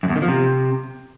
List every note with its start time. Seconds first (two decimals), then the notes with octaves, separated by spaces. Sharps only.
0.03 F#2
0.09 E2
0.16 D#3
0.22 F3
0.28 C3